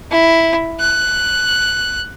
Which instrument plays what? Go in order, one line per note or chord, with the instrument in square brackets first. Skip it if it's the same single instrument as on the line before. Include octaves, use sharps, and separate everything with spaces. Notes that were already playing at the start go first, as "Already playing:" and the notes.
[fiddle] E4
F#6